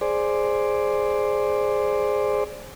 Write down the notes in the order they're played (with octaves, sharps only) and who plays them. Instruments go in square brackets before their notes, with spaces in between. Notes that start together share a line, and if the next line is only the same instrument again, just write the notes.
[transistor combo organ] G#4 C5 D5